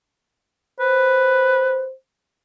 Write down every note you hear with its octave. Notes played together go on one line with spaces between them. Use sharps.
B4 C5